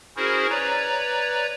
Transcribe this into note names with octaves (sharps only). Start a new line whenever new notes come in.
C#4 E4 F#4 G#4 A#4 C5
B4 C#5 D5 A#5